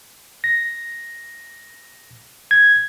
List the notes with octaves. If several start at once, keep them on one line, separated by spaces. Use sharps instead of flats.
A#6
G#6